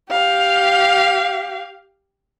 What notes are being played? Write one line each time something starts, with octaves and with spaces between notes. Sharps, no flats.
G4 F5